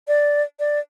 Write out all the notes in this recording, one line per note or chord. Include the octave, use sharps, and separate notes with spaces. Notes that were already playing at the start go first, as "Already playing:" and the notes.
D5
D5